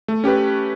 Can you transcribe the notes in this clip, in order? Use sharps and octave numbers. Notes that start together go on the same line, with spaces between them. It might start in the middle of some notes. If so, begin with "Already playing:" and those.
A3
C#4 G4 B4